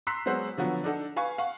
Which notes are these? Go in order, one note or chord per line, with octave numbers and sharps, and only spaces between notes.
A#5 C6 E6 F#6 B6 C7
F#3 G#3 B3 C5 F#5
D3 F3 F#3 B3
D4 D#4 A4 F#5
B4 F5 G#5 C#6
F5 F#5 C#6